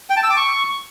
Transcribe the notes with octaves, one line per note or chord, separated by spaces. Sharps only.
G5
A5
E6
D6
C#6